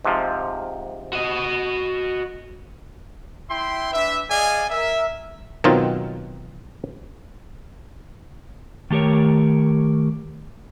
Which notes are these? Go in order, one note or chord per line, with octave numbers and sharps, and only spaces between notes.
G#2 C3 F3
F#4 D#5
E4 E5 G5 C6
D4 B4 E5
G#4 D5 D#5 F5 G#5
A#4 E5
B2 D#3 F#3 C4 D#4 F4
D#3 A3 G4 A#4 C#5